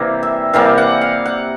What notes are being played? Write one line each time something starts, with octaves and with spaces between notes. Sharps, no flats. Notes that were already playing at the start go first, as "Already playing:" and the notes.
Already playing: C3 E3 G3 A#3
E5
C3 E3 G3 A#3 F5
F#5
F5
F#5